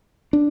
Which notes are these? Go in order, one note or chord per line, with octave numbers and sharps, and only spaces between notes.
D4